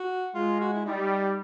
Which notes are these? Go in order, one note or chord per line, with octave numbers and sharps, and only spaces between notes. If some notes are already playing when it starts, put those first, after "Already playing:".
Already playing: F#4
G#3 F4
F#4
E4
G3 D#4